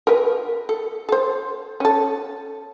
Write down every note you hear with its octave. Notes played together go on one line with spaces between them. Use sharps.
A#4 B4
A4
A4 C5
C#4 A4